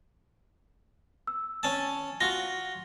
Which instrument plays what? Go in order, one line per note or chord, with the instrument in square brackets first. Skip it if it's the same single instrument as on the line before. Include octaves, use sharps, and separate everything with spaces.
[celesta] E6
[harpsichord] C#4 A5
[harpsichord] F4 F#4 [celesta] A#6